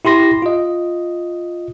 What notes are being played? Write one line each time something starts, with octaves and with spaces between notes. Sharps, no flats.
E4 G4 C6 A#6
F4 D#5